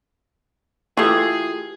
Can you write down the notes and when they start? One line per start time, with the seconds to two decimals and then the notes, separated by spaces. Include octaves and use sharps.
0.97 E3 A3 F4 G4 G#4 D#6 G#6 C7